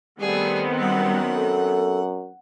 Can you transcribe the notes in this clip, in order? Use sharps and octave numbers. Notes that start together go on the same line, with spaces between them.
D#3 G3 A3 B3 C4 G#4
F#2 G3 F#5
A4